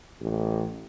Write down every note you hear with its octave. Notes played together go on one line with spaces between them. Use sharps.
A1